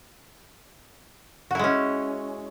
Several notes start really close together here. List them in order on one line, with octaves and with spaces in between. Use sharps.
F#4 E4 G#3 C#4